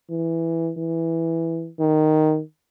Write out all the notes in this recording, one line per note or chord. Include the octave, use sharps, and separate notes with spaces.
E3
E3
D#3